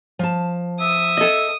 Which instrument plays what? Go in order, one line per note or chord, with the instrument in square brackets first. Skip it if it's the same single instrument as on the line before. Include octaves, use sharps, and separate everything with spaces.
[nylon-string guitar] F3 A5
[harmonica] E5 [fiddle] D#6
[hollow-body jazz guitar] A4 D#5